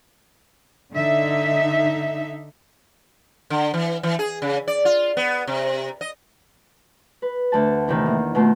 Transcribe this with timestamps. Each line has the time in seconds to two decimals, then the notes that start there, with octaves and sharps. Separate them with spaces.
0.92 D3 D#4 E5
3.50 D3
3.74 E3
4.03 E3
4.19 G#4
4.42 C#3
4.68 D5
4.85 F4
5.17 B3
5.47 C3
6.01 D#5
7.22 B4
7.52 D2 F#5 A5
7.88 E2 A2 C3 D#3 E3
8.06 A#3
8.35 B2 D#3 A3 F4